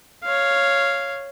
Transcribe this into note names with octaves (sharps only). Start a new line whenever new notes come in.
C#5 F5